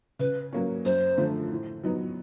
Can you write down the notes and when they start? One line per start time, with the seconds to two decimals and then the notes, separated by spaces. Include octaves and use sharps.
0.19 C#3 B4
0.53 F#3 A#3 C#4
0.85 F#2 C5
1.17 D3 F3 A3
1.51 A2
1.83 F#3 B3 D#4